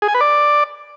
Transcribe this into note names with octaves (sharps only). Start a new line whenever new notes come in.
G#4
G#5
B4
D5